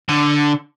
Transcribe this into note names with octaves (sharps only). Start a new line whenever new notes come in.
D3